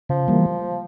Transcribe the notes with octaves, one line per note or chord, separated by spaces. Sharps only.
C#3 F3
E3 G3 A#3